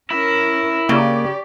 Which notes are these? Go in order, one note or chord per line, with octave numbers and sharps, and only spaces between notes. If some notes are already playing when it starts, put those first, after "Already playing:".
C#4 E4 A#4
C#3 A#3 G4 D5